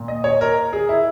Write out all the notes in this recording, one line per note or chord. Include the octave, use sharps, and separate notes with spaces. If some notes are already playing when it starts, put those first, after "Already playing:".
Already playing: A#2
D#5
C#5
A#4
G#4
E4